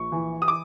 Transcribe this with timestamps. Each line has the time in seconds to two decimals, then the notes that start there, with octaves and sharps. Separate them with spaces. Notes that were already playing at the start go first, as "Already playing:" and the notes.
Already playing: A#1 C#6
0.12 E3
0.42 D#6
0.48 D6